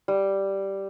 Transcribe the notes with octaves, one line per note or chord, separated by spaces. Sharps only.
G3